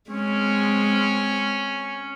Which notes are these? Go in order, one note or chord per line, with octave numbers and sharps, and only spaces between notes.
G#3 C4 C#4